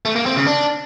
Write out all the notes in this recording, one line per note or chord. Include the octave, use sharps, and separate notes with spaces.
A3
A#3
C4
C#3
D4